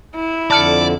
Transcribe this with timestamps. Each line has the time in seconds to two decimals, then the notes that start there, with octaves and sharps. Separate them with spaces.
0.15 E4
0.51 F2 D3 D5 A5 F6 C#7